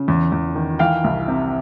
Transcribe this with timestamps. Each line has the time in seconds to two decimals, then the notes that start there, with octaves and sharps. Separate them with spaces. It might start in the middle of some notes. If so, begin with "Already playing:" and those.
Already playing: C#3
0.08 E2
0.32 E2
0.55 D#3
0.79 E3 F5 G5
1.04 C2
1.28 C3